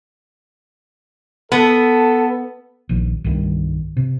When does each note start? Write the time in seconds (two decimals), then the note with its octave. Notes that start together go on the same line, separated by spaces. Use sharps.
1.52 B3 A4
2.89 A#1 D#2
3.24 C2 G2 D#3
3.97 C3